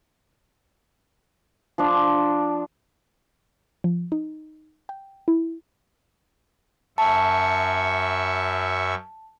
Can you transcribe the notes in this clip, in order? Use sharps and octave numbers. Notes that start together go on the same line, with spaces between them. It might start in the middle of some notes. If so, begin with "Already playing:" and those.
F3 D4
F3
D#4
G5
E4
F#2 E5 A5 C#6